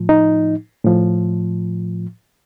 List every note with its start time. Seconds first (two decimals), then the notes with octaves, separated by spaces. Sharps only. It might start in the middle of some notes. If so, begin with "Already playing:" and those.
Already playing: A2 F3
0.09 D#4
0.85 A2 F3